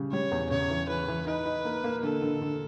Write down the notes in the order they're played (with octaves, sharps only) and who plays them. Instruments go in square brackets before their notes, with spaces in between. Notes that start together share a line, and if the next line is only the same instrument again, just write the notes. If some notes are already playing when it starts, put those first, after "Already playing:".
Already playing: [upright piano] C#3 G3
[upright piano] G3 [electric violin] C#5
[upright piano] E2
[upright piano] C#3 [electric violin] C#5
[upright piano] E3
[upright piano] E3 [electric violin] B4
[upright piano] E3
[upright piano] D#4 [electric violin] B4
[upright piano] D#4
A#3
A#3
[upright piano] D3 [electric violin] A4
[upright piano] D3
D3